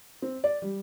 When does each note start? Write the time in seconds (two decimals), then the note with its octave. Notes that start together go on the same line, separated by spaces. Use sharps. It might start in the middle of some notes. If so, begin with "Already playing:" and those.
0.22 C4
0.44 D5
0.62 G3